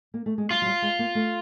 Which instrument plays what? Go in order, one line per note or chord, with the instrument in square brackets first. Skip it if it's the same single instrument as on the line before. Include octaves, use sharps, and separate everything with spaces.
[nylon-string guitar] A#3
A3
G#3
[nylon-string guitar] G3 [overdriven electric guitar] F4
[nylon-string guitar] F#3
G3
G#3
A#3
A3